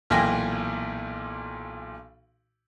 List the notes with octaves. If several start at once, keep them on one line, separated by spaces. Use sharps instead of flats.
B1 A#2 E3 G5 G#5 A#6